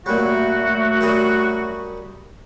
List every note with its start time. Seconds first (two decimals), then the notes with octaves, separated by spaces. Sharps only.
0.06 A#2 F#3 G3 A3 F#4
1.01 F#2 G3 D#6